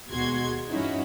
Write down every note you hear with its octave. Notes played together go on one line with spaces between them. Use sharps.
D#2 B2 G#3 F#4 C6 G#6
G2 E3 C#4 D#4 E4 F#4